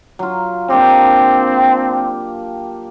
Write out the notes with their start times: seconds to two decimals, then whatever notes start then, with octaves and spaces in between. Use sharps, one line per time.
0.19 F#3 F4
0.70 A#3 C4 D4 G4